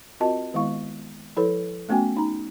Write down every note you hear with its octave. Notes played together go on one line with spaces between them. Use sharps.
C4 F4 F#4 A#4 D#5 A5
D#3 G#3 B3 E4 F5 C#6
F3 E4 A4 B4 C#5
A3 B3 C#4 F#4 G5 G#5
D#4 A#5